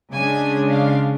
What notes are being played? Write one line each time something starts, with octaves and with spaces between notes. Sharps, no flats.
C#3 G#3 D4 G#5
F5